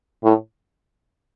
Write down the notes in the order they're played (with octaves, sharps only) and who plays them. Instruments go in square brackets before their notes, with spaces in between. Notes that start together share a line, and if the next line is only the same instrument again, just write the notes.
[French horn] A2